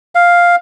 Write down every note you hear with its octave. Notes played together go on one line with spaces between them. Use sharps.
F5